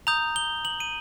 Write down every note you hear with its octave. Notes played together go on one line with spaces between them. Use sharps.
A#5 D#6 G6 F7
G7
F#7
D#7